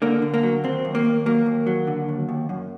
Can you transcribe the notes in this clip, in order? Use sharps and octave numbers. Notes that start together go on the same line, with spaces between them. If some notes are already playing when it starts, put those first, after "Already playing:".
D3 A#3
D3
A#3
F#3
D#2 C4
D#2
A#3
D#2
F#3 A#3
D#2
F#3
D3
D#2
D#2
F#2